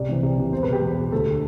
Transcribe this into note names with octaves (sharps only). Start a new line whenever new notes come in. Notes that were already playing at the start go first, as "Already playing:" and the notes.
Already playing: C2 D5
C3 E3
C2
C3 E3
E2 C5
B4
B2
G4
E2
B2
D2 A4
D3